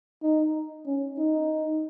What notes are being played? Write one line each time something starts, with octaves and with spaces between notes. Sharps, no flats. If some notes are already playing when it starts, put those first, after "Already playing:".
D#4
C#4
D#4